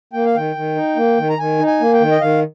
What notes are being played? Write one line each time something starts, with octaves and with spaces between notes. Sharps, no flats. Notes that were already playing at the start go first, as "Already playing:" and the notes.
A#3 G5
F5
D#3 G5
D#3
D#4
A#3
D#3
A#5
D#3 G#5
D#4
G#5
A#3
G5
D#3
D#5
D#3 F5